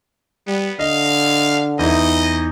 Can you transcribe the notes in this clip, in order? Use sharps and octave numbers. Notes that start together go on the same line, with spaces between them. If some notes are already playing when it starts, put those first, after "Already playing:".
G3 B3
D3 D#5 F5
E2 D#4 E4 D#5